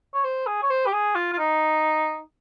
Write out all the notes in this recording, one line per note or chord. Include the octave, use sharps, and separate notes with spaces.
C#5
C5
G#4
C#5
C5
G4
G#4
F4
F4
D#4